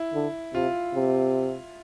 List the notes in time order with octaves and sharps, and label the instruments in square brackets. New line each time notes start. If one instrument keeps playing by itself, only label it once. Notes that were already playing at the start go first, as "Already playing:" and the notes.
Already playing: [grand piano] E4
[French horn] D3
[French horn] C3 [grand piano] F4
[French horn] C3